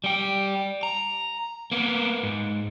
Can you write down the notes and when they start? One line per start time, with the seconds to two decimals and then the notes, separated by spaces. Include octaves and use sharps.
0.04 G3 G5
0.83 A#5
1.72 A#3 B3
2.23 G#2